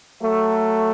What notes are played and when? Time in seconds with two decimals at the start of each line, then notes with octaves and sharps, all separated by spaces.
0.21 F#3 A3